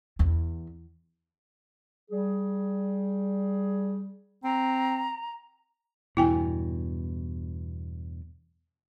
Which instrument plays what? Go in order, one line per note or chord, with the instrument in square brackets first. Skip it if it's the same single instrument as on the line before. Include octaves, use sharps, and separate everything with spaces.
[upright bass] E2
[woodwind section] G3 G#4
[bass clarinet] C4 [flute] A#5
[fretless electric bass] E2 G2 B2 [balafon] E4 G5 G#5